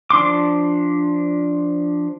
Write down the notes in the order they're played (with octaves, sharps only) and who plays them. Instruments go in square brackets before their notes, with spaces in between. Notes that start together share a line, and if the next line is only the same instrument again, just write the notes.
[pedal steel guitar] F3 D4 C6 D6